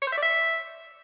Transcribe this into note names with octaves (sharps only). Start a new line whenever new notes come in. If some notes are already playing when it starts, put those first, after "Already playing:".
C#5
C5
E5
D5
E5